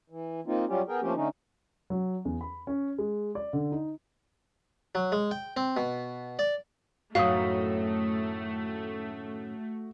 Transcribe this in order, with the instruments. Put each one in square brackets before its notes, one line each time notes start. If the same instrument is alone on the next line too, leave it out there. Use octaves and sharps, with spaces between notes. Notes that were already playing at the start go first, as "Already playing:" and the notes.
[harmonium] E3
A#3 C4 D#4 F4
F#3 G3 C#4 F4 G4
B3 G#4 A#4 G5
F3 A3 A#3 C4 C#4 G4
D3 A3 C#4 D#4
[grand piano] F#3
E2
B5
C#4
G#3
D5
D3
D#4
[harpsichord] F#3
G#3
G5
C4
B2
D5
[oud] F#2 A2 D#3 [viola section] A3 [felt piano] F#4 D#6 [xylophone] F5